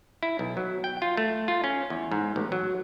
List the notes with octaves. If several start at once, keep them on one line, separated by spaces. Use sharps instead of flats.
E4
B1
F#3
G5
F4
A3
F4
C#4
E2
G#2
A1
F#3